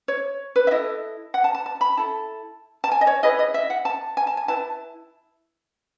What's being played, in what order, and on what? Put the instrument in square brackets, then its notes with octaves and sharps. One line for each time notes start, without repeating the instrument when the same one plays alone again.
[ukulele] C#5
B4
E5
E4 A4 D#5
F#5
A5
A5
A5
B5
E4 A4 A5
A5
G#5
D#5
C#5
E4 G#4 B4 D#5
D#5
E5
F#5
A5
G#5
A5
G#5
E4 B4 A5